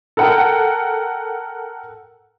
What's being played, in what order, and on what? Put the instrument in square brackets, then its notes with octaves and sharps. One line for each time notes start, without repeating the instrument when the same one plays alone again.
[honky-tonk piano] A4 A#4 F#5 G5